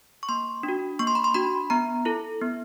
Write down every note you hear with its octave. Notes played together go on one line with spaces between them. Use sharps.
C#6
A#3 C6
D4
F#4
A#3 C#6
C6
B5
C6
D4 F#4 B5
B3 A#5
E4 A4
B3